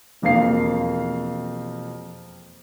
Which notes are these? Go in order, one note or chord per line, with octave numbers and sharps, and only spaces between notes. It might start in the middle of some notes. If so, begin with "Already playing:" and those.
E1 F2 A#3 C4 F5 C7